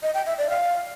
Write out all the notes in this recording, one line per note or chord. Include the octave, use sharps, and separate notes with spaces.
D#5
G5
E5
D5
F5